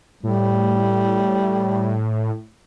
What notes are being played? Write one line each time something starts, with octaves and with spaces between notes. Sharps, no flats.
A2 G3